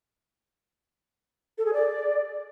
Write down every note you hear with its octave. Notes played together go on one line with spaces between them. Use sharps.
A4
G#4
D5